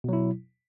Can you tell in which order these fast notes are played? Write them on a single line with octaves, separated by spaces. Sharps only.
B2 F#3 E4